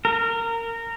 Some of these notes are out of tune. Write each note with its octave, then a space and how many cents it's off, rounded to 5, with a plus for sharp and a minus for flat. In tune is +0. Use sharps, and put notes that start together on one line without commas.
A#4 -20